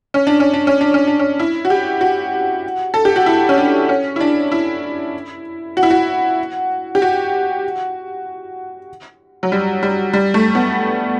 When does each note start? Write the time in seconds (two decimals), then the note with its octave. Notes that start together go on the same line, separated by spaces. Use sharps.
0.14 C#4
0.27 D4
0.40 C#4
0.54 D4
0.67 C#4
0.81 D4
0.94 C#4
1.07 D4
1.19 C#4
1.39 E4
1.65 F#4
1.70 G4
2.01 F#4
2.94 A4
3.05 G4
3.16 F#4
3.26 E4
3.49 C#4
3.58 D4
3.89 C#4
4.16 E4
4.21 D4
4.52 E4
5.77 F#4
5.83 E4
5.90 F#4
6.95 G4
7.02 F#4
9.43 F#3
9.52 G3
9.83 G3
10.13 G3
10.34 A3
10.55 B3